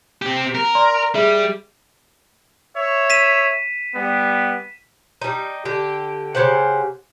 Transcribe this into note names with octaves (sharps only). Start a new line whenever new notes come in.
C4 G4
A#4
D5 A#5 C6
G3 G#4 E5
C#5 E5
B6 D#7 E7
G3 B3
G3 D#4
D3 G4
C#3 G4 C5 F#5